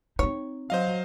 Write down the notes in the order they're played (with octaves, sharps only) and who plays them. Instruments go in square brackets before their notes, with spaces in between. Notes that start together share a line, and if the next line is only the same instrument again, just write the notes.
[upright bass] C4 D#4 [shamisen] C#5
[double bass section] F#3 [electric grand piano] C5 D#5 F5